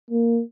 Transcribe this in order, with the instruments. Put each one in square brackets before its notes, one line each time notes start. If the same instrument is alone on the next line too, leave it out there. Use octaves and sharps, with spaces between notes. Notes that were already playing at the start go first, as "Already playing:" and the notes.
[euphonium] A#3